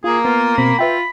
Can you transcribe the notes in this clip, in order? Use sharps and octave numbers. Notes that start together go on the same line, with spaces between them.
A#3 F4 G#4
B3 F4
B2 C4 B5
F4 B4 E5 G5